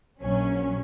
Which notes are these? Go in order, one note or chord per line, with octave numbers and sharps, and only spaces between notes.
A#1 F#3 C#4